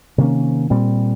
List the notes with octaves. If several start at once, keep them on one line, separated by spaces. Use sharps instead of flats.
C3 D#3 A#3 C#4
A#2 G3 C4